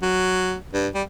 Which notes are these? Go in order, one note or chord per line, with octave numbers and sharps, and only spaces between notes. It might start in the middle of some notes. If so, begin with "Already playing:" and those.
F#3
G2
G3